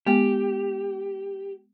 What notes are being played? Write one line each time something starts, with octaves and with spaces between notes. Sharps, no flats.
G#3 B3 G4 G5